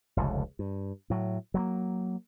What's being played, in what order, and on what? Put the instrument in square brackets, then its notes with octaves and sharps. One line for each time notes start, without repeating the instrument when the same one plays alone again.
[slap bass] F1 C#2 D3
G2
A2 F#3
F#3 G#3 A#3